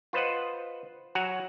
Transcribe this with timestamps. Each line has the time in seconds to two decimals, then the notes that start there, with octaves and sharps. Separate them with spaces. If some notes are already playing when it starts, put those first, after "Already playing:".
0.13 F4 B4 C5 D#5 F#5
1.15 F#3 F#4 F#5 G#5 A#5